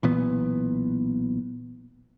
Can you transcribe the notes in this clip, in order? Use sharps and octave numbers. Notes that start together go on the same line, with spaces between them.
B1 A#2 E3 B3